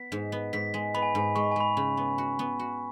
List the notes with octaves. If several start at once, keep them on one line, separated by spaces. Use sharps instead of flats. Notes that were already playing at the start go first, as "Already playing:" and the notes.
Already playing: B3 B6
G#2
B3
G#2 B6
G#3
B3 B5
G#5
G#2 G#5
G#3 C#6
B5
G#5
G#3 B5
C#3
B3
F#4
B3
F#4